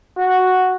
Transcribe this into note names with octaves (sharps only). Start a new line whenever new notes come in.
F#4